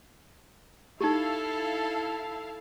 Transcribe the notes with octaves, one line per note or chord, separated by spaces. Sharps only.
D#4 E4 G4 A4 F5 A5